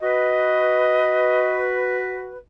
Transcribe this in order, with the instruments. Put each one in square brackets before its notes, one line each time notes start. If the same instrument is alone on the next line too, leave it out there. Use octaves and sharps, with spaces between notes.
[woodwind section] F#4 B4 [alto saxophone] D#5